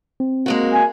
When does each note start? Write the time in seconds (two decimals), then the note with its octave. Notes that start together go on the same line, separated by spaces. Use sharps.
0.20 C4
0.46 G#3 A#3 F#4
0.74 G#5